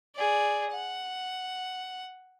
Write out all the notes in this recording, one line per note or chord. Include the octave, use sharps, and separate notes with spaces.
G#4 D5
F#5